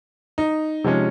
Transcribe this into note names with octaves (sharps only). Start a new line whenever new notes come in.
D#4
C3 F3 G#3 C#4